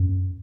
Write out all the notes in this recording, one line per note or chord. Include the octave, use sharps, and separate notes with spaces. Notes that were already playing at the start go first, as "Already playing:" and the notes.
Already playing: F#2